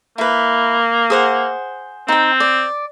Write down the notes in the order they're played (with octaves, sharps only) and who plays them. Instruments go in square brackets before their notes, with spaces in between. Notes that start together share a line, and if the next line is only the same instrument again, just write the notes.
[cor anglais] A#3 [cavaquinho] E4 B4
[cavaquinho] G#4 C5 F#5
[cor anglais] C4 [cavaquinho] D#4 G5
[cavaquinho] D5